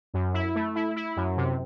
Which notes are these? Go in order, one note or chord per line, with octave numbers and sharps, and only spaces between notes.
F#2
E4
A3
E4
E4
F#2
C3